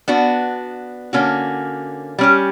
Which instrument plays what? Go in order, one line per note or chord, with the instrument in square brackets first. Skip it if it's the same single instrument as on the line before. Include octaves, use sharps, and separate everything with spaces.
[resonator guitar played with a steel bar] B3 D4 F#4
D3 A#3 C#4 F#4
G3 C#4 G4